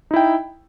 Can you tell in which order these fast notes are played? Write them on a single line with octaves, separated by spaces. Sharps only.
D#4 E4 G5